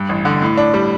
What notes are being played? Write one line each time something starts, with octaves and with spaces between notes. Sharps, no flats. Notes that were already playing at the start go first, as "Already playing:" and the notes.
Already playing: G2
A1
D3
A2
D4
G3